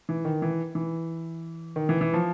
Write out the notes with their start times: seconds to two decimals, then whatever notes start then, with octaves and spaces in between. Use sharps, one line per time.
0.09 E3
0.25 D#3
0.42 E3
0.75 E3
1.76 D#3
1.89 E3
2.01 E3
2.14 F3